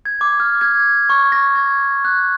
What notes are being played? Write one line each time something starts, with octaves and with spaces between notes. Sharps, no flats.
G#6
D6
F6
G#6
C#6
A#6
G#6
F#6